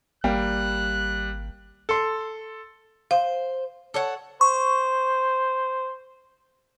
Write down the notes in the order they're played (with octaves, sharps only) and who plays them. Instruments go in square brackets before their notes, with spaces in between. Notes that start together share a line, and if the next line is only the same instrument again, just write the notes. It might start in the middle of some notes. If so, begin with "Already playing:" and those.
[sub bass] G#1 [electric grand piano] G3 [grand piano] A#3 F5 G5 [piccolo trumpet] F#6
[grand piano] A4 C6
[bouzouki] C5 [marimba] F5
[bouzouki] A4 C#5 F#5
[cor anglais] C5 [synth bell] C#6